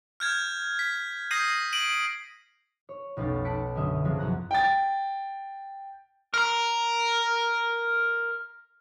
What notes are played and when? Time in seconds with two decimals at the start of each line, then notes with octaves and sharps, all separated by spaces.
0.20 F6 G6 G#6
0.79 B6
1.31 D#6 G6 A#6 C7 D#7
1.73 D7 D#7 F#7
2.89 C#5
3.17 F1 B1 C#4 C#5 A6
3.45 F#5 A5 E6 B6 C#7 D7
3.75 F#2 D3 C#4 D#5 E5
4.05 C3 F3 G#3 C4 C#4
4.18 C2 F#2 F#5 A#5 F#6
4.51 G5 A6
6.34 A#4 A#5